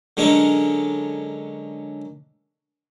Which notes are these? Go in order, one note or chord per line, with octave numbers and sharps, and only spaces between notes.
D3 F#3 G#3 C#4 A#4